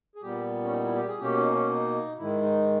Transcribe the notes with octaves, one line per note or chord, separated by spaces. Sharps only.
G#4
A#2 G3 B3 G4
C#4
D#4
E4
G4
G#4
B2 A#3 C#4 G4
D#4
C#4
D#4
G#2 D#3 G#3 E4
D#4